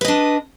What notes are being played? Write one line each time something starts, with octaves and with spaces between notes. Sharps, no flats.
D4 B4 D#5